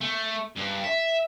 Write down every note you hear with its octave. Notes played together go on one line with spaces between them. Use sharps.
A3
G2
E5